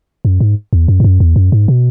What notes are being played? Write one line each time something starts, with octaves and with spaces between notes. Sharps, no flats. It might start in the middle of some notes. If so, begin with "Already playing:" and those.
F#2
G#2
E2
F#2
G#2
F#2
E2
F#2
G#2
B2